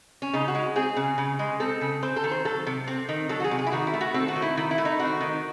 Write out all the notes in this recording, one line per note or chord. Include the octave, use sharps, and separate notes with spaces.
C#4
C#3 D#4
F#4
G#3
C4 G#4
C#3
C#3
G#3
C4 A4
C#3
C4 C5
A4
D#3
C5
F#3 A4
C3
C4
D#3
F#3 A4
F#4
G#4
C3
G#4
E4
D#3 F#4
E4
A3
F#4
C4 A4
F#4
D#3
E4
D#3 E4
E4
A3
D#4
C4 F#4
D#3